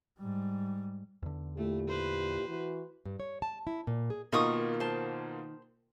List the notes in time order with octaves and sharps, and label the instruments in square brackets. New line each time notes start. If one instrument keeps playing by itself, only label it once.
[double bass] G#2 G3
[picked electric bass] E2 D3
[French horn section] A#2 E4 G4 [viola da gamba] A3
[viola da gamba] B4 C5
[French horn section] E3 F#4
[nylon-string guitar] G2
C#5
A5
E4
A#2
G#4
[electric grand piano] B2 A#3 F4 [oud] D#3 [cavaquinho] D#5 C#6 D#6
[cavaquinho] C5 A5